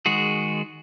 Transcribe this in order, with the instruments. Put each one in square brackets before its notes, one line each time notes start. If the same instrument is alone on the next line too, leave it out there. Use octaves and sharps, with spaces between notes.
[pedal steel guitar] D#3 G#3 F#4 G#4